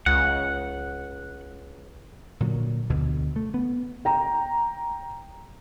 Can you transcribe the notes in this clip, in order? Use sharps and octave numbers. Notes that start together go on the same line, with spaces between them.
C#2 F#5
A#2 D3 F#3
D2 B2 D3
A3
B3
G5 A#5